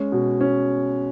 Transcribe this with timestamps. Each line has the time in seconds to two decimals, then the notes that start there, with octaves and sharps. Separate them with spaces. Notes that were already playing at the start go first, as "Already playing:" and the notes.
Already playing: G#3 C#4
0.12 B2
0.41 C#4